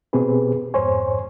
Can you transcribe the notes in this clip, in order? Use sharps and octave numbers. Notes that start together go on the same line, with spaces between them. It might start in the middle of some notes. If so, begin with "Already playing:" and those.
B2 B3 C4 G4 G#4 B4
F2 G#2 C5 C#5 G#5